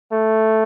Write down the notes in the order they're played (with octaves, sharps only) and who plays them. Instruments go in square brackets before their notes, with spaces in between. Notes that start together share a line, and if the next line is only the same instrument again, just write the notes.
[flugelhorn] A3